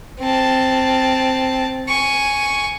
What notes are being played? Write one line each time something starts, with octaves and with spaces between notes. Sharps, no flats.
C4 A5
G#5 C#6